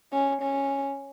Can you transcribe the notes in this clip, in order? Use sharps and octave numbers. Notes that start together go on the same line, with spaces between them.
C#4
C#4